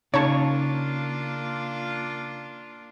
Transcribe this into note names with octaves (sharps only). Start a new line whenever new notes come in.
C#3 A#3 D4 D#4 F4 C#5 A5 C#6